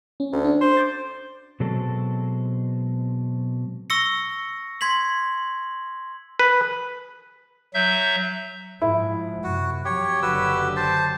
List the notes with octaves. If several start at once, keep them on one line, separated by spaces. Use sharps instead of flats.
C#4
D2
D4
C5
D6 G6 A6
B2 F#3 G#3 C4 A4
C#6 E6 A#6 C#7
C6 G#6 B6 F#7
B4
F#3 E5 G6
G#2 F3 E4
F#2 C3 F#4
F2 F#3 G4 C#5
F#1 D3 F#3 F#4 B4 E6
C5 A5